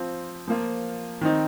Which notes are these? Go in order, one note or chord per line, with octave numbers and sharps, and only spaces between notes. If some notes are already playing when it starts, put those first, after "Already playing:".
Already playing: F3 C4 F4
F3 A#3 F4
D#3 C4 D#4